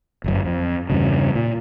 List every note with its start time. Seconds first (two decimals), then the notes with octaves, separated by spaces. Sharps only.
0.24 G1 F#2
0.45 F2
0.90 E2 G2 C#3
1.35 A#2